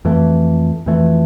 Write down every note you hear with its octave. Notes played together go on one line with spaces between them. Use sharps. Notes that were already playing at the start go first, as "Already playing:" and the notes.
F2 E3 A3
F2 E3 A3